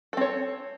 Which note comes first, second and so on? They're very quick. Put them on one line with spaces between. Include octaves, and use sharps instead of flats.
A4 C4 C#5